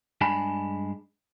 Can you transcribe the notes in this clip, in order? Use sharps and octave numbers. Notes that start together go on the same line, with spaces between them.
G2 G#3 D4 G#5 A5 B5